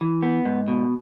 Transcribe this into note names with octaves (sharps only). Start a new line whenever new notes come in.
E3
B3
G#2
B2